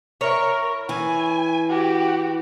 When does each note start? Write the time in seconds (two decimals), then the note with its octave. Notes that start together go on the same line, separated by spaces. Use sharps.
0.21 E4 A#4 C#5
0.89 E3 G#5
1.70 F#4 G4